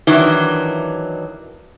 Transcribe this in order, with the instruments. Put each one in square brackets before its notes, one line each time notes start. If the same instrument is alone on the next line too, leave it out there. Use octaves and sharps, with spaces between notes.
[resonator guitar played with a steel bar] D#3 E3 F#3 D4